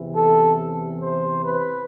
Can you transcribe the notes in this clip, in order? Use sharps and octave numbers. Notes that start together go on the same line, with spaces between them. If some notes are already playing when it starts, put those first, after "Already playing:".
Already playing: E2 C3 E3
A4
C5
B4